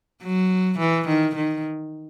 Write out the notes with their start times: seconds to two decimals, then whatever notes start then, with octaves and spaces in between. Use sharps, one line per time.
0.23 F#3
0.80 E3
1.09 D#3
1.36 D#3